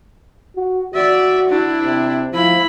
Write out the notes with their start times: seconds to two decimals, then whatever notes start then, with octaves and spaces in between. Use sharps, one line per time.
0.56 F#4
0.94 F#4 D5 E5
1.49 D4 E4
1.84 C3
2.33 F3 E4 B5